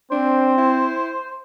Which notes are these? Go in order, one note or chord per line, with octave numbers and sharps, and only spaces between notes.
C4 D4 C5
E4